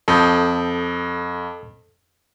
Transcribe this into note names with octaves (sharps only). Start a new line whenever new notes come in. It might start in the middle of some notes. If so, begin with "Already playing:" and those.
F2 A4 D#6 G6